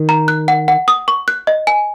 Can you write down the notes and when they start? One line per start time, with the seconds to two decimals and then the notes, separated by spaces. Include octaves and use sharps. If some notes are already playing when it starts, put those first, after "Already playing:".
Already playing: D#3
0.09 A#5
0.28 F#6
0.48 F#5
0.68 F#5
0.88 D#6
1.08 C#6
1.28 F#6
1.47 D#5
1.67 G#5